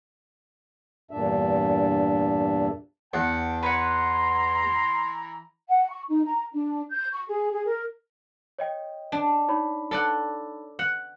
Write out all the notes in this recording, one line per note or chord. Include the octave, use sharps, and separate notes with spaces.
E2 G2 A#2 D4 E5
E2 F#5 G5 A5
E3 B4 C#5 F#5 A#5 C6
F#5
C#6
D#4
A#5
D4
G6
C#6
G#4
G#4
A#4
C#5 D#5 G5
D4
D#4 C#5 B5
A4 D5 F#5
F#5